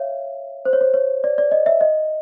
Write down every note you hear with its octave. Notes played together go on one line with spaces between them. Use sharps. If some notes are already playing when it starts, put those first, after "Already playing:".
Already playing: C#5 E5 F5
C5
C#5
C5
C#5
D5
D5
D#5
E5
D#5